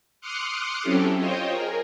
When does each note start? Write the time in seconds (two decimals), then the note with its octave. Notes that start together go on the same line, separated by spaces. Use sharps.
0.21 C6 D6 D#6 F6 F#6 C#7
0.83 F#3 C4 C#4 E4 G4 A4
1.17 F4 C5 C#5 D#5 G5
1.47 G#4 A#4